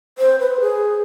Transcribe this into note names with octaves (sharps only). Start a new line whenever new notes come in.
C5
B4
G#4